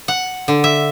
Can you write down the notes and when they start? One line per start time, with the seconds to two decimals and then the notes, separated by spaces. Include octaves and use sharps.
0.08 F#5
0.48 D3
0.64 E5